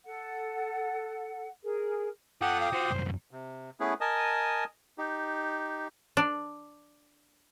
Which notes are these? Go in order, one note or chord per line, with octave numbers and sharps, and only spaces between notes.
A4 F#5
G#4 A#4
F4 A4 F#5 G5 D6 D#6
F5
F4 F#4 C5
C2 F#2
C3
A3 B3 C#4 E4 G#4 B4
A#4 D#5 G#5 A5 D#6
D#4 G4
D4